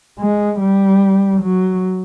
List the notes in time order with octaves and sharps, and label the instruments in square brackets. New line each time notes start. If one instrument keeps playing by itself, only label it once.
[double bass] G#3
G3
F#3